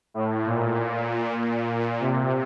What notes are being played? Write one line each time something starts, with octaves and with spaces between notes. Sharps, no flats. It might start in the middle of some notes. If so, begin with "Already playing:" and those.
A2
A#2
A#2
C3